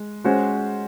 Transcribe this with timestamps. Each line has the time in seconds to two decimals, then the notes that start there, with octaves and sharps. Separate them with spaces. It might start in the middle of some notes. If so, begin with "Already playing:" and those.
Already playing: G#3
0.24 G#3 C#4 F#4 C5